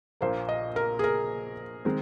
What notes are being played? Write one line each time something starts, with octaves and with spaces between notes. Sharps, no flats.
A#1 A#2 A#3 C5
D#5
A#4
G#4
A#4
D#3 G#3 C4